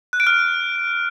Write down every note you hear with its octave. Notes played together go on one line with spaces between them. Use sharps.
F#6
D7
F6